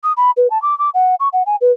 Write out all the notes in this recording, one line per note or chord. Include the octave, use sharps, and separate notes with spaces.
D#6
B5
B4
A5
D6
D6
F#5
C#6
F#5
G#5
B4